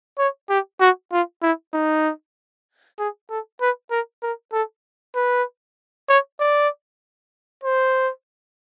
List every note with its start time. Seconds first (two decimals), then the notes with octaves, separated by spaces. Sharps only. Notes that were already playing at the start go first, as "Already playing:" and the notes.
0.18 C#5
0.50 G4
0.80 F#4
1.12 F4
1.42 E4
1.74 D#4
2.99 G#4
3.30 A4
3.61 B4
3.91 A#4
4.23 A#4
4.53 A4
5.15 B4
6.09 C#5
6.40 D5
7.64 C5